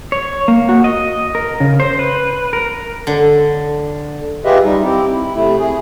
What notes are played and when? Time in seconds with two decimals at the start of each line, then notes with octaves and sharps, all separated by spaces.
0.12 C#5
0.48 A#3
0.69 F#4
0.84 D#5
1.35 A#4
1.60 C#3
1.80 C5
1.99 B4
2.53 A#4
3.07 D3
4.45 F4 G4 G#4 B4 D#5 E5
4.65 G3 D#4
4.83 C4 E4 G4
5.12 E4
5.35 C3 A3 E4
5.59 G#4